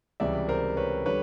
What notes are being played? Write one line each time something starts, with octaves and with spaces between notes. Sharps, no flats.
C#2 C3 E3 G3 D5 E5
A#4 C5
B4 C#5
D3 G3 B4 C#5